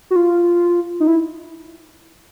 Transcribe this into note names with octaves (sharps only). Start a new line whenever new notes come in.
F#4
F4
D#4
E4